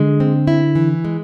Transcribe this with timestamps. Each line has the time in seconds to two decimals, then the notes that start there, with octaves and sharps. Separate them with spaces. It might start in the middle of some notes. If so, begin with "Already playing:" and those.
Already playing: D3 G#3
0.20 C4
0.47 E4
0.75 E3
1.05 G#3